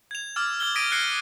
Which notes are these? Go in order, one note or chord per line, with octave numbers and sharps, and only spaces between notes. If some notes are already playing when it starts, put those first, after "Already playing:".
G#6 F7
D6 E6 F6 A6
F6 G#6 G7
D#6 G#6 A#6 B6 D7 D#7
D#6 F#6 G#6 A#6 C7 C#7